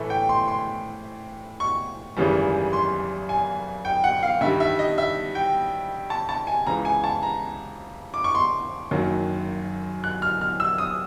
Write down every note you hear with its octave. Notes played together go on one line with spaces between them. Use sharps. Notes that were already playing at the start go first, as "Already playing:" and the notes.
Already playing: A2 E3 A3
G5
C6
C6
C#6
G#1 F#2 C#3 E3 G3
C6
G#5
G5
F#5
F5
G2 D#3 G3 E5
E5
D#5
E5
G5
A5
A5
G#5
C#2 C#3 E3 A#5
G#5
A5
A#5
D6
C#6
C6
F#1 F#2 D#3 F#3 A#3
F#6
F6
F6
E6
D#6